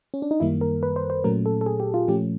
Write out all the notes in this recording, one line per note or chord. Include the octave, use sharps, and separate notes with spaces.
C#4
D4
D#4
F#2 D#3 G3 A#3 E4
A#4
B4
C5
C5
A#2 F#3 A3 C#4 A#4
A4
A4
G#4
G4
F4
A#2 F3 A3 C#4 G4